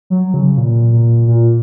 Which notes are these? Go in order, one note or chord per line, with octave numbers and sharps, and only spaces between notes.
F#3
C#3
A#2
A#2
A#2